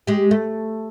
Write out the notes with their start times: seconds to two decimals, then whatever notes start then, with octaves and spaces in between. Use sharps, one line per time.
0.07 G#3 G4
0.31 A3